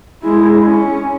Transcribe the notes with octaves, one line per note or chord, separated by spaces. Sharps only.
G#3 E4
C#4